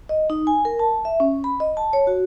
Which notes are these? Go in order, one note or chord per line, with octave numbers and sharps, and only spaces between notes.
D#5
D#4
G#5
A#4
A5
E5
C#4
B5
D#5
A5
C#5
F#4